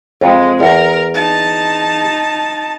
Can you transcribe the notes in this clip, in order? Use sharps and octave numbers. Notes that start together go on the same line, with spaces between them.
F2 G#3
E2 A#4
D#4 A5